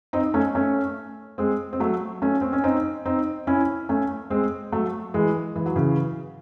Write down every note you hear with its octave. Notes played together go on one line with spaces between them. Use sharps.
C4 D#4
A3 C#4
A3 C#4
G#3 C4
C4
F#3 A3
A3 C#4
C4
C#4
C4 D#4
C4 D#4
C#4 E4
A3 C#4
G#3 C4
F#3 A3
E3 G#3
E3
F#3
C#3 E3